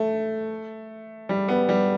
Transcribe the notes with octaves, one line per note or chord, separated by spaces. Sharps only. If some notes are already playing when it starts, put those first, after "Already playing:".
Already playing: A3
G3
B3
G3